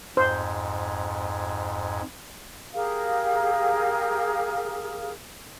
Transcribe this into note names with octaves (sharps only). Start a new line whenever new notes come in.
F2 G#2 C5
G4 G#4 A#4 F5